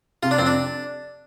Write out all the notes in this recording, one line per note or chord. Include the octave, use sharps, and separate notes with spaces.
C3 F4
D4
F2 C4
D4